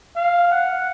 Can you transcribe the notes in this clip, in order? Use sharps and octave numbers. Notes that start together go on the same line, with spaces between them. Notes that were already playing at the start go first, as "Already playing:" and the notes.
F5
F#5